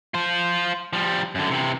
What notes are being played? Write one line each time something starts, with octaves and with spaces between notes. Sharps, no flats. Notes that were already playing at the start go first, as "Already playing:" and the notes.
F4 C5
F3 G3
F#2 D3
C3 E3